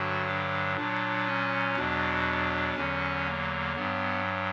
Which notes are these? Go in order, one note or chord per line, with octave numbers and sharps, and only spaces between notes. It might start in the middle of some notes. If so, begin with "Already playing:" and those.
Already playing: G2 D3 F#3 F#4
D4
A#2 F#3 D4
C#4
E2 B2 F#3 D4
E2 D3 F#3 C#4
A#3
G2 F#3 B3